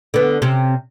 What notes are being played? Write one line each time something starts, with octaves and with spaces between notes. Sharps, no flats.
D3 B3
C3 C#4